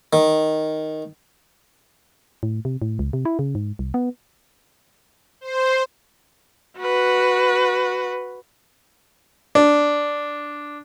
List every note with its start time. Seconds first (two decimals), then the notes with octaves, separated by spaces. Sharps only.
0.13 D#3
2.43 A2
2.65 C3
2.82 A2
2.99 C#2
3.13 C3
3.25 E4
3.39 C#3
3.55 G#2
3.79 C2
3.94 B3
5.41 C5
6.79 F#4 B4
9.55 D4